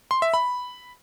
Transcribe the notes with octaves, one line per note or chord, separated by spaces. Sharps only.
C6
E5
B5